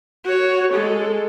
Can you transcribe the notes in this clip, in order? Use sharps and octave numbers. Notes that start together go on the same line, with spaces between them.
F#4 C#5
G#3 A4